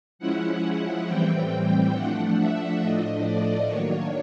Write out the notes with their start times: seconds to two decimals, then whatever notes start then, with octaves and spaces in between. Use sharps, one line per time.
0.19 F3 G#3 C#4 E4 F#5
1.07 A2 E3 G3 C4 G5
1.93 F3 A3 D4 F#5
2.38 E5
2.80 A2 F3 A3 D4 D#5
3.24 D5
3.68 D#3 F#3 A#3 D4 C#5